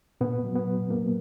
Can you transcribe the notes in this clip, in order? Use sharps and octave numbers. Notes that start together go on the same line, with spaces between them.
A#2 B3
F#3
B3
A#2
F#3 A#3